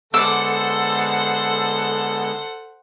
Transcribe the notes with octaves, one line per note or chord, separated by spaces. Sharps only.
D3 G#3 B3 A4 C5 F#5 D6 E6